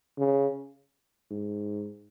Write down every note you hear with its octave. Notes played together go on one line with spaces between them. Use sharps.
C#3
G#2